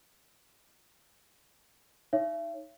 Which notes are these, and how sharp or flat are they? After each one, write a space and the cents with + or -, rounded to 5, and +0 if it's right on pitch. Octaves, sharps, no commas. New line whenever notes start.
D#4 +10 C#5 +0 E5 +40